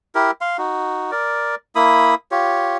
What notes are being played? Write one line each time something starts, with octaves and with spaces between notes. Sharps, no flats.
E4 G4 A#4
F5 C6
D#4 F#4
A#4 D5
A#3 E4 B5 D#6
F4 G4 C#5